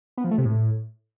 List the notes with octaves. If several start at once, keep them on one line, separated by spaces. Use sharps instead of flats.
B3
F3
A3
C3
A2